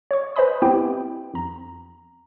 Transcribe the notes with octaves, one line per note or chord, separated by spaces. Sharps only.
C#5 C#6
B4 C5 D#5 G#5 B5 D#6
B3 C4 E4 G4 G5
F2 A#5